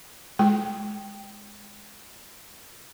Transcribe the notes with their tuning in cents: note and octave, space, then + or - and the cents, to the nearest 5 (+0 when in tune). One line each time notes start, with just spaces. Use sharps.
G#3 +0 G5 +0